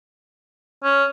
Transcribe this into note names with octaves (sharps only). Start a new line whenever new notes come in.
C#4